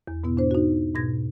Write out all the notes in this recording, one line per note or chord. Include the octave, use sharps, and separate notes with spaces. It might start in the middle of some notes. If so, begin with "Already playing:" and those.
E2
G#2 B2 B3 E4
D4 C5
D#4 F#4
G#2 B2 G#6 A#6